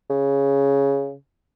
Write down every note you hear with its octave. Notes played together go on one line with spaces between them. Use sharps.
C#3